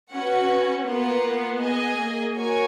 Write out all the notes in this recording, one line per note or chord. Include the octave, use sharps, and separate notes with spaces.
C#4 F#4 B4 F#5
A#3 B3 F4 B4 F#5
B3
G#4 D#5 G#5
A#3
F#4 A#4 C#5 G#5